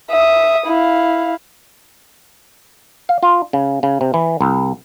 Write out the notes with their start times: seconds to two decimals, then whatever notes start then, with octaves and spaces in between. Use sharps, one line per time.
0.10 E5 D#6
0.66 E4 F5
3.09 F5
3.23 F4
3.53 C#3
3.83 C#3
4.01 C3
4.14 E3
4.41 C2